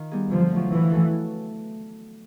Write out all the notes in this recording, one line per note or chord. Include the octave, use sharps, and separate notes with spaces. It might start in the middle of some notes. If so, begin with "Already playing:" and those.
Already playing: D#3 F4
G3 B3 D#4 G#4
D3 F3
F#3 A3
E3 F3
A3 C#4 F#4 A4